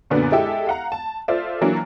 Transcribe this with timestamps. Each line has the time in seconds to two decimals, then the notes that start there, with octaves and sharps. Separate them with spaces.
0.10 F#2 A#2 D3 B3 D4
0.32 G#3 E4 G4 A4 E5
0.67 F5 F#5 A#5
0.92 A5
1.28 F4 A4 C5 D5 E5
1.61 E3 F#3 A#3 D4 E4